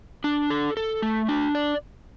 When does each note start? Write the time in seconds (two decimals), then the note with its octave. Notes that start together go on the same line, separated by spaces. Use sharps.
0.24 D4
0.50 A4
0.77 A4
1.02 A3
1.28 D4
1.55 D5